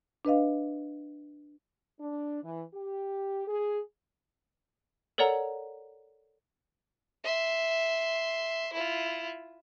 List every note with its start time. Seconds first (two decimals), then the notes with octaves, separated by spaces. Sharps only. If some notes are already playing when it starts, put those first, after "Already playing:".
0.25 D4 B4 D#5 F5
1.99 D4
2.43 E3
2.74 G4
3.47 G#4
5.18 A4 A#4 C#5 D5 F#5 A#5
7.24 E5 C6
8.73 E4 F4